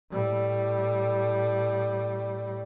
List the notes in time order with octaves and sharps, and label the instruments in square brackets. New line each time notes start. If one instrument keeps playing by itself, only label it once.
[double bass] A2 G3